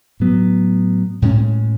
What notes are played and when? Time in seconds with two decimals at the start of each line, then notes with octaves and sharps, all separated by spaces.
0.20 A2 F#3 B3
1.22 A2 G#3 C#4